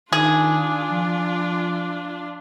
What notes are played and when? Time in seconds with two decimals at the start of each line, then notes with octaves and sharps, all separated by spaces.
0.12 D#3 D4 F4 G#4
0.91 F3